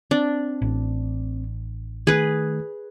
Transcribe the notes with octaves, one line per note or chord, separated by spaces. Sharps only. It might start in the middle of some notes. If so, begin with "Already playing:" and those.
C4 D4
A1
D#3 A3 G#4 B4